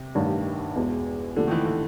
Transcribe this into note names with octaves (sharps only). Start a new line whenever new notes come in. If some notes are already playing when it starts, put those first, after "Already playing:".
Already playing: C3
A1 G2 D#3 G3
E2 B2 G#3
C2 A#2 D3 F3 A3 D4
D#3
E3
E3